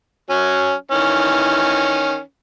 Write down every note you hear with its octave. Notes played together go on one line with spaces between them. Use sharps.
F#3 C#4
D#3 E3 C#4